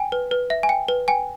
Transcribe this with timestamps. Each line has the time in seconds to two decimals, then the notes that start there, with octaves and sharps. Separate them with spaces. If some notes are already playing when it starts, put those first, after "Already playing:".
Already playing: G5 G#5
0.12 B4
0.31 B4
0.50 E5
0.63 G#5
0.69 G5
0.88 B4
1.08 G5 G#5